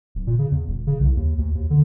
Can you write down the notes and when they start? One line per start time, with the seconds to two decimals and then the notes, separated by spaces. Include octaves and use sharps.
0.15 D1
0.27 A#2
0.39 C#3
0.51 E2
0.67 D#1
0.87 C#3
1.00 C2
1.16 D#2
1.38 D2
1.55 D#2
1.70 D3